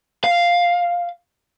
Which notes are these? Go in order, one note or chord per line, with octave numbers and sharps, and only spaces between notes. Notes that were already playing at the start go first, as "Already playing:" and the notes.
F5